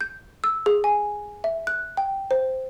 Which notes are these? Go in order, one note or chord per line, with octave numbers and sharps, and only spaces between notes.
G6
E6
G#4
G#5
E5
F#6
G5
C5